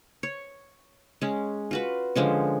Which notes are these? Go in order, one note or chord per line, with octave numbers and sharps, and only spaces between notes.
C#5
G#3 C#4
F4 F#4 B4
D3 F3 G#3 C#4